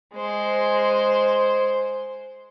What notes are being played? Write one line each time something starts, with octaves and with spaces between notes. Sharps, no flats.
G#3 C5